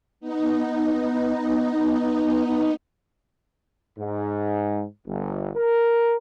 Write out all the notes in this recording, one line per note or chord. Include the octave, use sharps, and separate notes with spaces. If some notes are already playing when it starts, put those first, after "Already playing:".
B3 D#4
G#2
G1
A#4